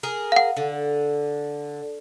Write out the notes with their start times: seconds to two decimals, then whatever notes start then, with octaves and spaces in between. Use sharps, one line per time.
0.03 G#4 A#4
0.32 F5 F#5
0.57 D3